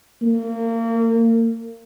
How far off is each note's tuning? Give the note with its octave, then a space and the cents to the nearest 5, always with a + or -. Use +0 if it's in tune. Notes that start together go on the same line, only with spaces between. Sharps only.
A#3 -30